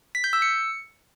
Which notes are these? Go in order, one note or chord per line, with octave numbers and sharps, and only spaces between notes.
B6
G6
E6
C#7